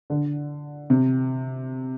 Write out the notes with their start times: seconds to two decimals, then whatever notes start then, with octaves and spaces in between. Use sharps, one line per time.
0.10 D3
0.90 C3